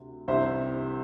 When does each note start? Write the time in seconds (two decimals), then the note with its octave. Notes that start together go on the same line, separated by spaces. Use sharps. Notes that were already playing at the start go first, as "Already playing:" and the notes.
Already playing: D2 C3
0.28 C2 C3 E3 C5 E5